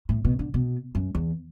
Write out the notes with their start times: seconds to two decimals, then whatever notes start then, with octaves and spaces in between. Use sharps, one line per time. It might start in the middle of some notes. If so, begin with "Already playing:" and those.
0.09 A2
0.25 B2
0.39 D3
0.54 B2
0.95 F#2
1.15 E2